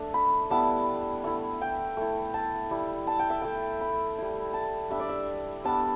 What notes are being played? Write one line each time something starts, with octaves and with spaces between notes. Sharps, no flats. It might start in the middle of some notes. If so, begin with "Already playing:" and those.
Already playing: A3 D4
B5
G3 B3 E4 A5
A3 E4
G5
A3 E4
A5
G3 E4
A5
G5
E5
A3 E4 G5
B5
G3 E4
A5
G3 D4 E5
D5
E5
G3 B3 D4 A5